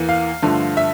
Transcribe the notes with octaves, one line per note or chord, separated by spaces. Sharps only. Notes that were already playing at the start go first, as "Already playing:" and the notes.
Already playing: E2 E3 A#3
F5
G2 D3 F3 A3
E5